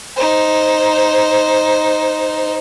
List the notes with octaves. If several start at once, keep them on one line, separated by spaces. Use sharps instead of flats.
D#4 C5